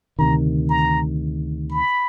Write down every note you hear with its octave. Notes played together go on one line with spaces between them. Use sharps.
D2 C3 D#3 A#5
A#5
B5